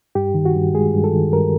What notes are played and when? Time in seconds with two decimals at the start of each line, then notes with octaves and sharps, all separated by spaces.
0.15 G2 G4
0.34 D#3
0.45 F#4
0.55 G2
0.75 G#3 G#4
0.94 G2
1.04 A4
1.13 D#3
1.33 G2 A#4